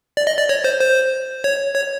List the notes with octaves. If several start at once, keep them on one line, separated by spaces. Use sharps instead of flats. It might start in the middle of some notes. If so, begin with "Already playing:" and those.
D5
D#5
D5
C#5
C5
C5
C#5
C#5